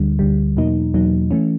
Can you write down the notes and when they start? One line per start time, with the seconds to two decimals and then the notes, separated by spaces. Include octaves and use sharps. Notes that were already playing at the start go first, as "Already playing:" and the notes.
Already playing: D2 D3 G3
0.19 D2 D3 G3
0.57 E2 B2 F#3 A#3 D#4
0.94 E2 B2 F#3 A#3 D#4
1.31 E3 A3 C#4